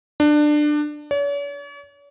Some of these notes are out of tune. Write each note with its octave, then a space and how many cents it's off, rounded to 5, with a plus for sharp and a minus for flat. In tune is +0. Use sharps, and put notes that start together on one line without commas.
D4 +20
C#5 +45